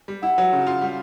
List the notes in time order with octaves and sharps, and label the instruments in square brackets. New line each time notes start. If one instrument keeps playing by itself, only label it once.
[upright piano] G3
[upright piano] E4 [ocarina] F#5
[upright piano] F#3
C#3
F4
G3